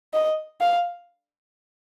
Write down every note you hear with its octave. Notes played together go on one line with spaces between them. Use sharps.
D#5
F5